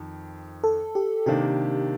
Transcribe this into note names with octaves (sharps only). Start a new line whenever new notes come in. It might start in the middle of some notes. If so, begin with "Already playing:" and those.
Already playing: F2 D#3
A4
G4
C3 D#3 A#3 D4 G4